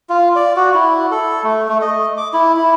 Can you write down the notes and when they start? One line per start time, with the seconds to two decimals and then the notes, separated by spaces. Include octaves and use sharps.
0.10 F4
0.36 D5
0.56 F#4
0.75 E4
1.11 A4
1.44 A3
1.68 A3
1.82 D#5
2.17 D6
2.34 E4
2.57 E4